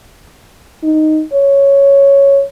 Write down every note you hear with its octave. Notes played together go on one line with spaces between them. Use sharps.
D#4
C#5